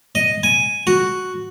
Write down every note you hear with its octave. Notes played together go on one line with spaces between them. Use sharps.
D#5
G#5
F#4